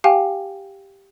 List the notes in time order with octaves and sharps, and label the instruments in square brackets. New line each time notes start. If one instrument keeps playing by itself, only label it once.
[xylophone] G4 F5 G5 G#5